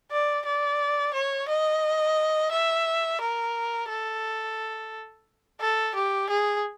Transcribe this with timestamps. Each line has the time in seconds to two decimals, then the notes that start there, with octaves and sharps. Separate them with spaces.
0.12 D5
0.46 D5
1.14 C#5
1.48 D#5
2.52 E5
3.21 A#4
3.89 A4
5.61 A4
5.95 G4
6.30 G#4